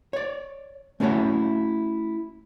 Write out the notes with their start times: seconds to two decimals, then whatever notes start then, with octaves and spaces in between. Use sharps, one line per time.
0.13 C#5 D5
1.00 A3 C#4 E4 F#4 C#5 F#5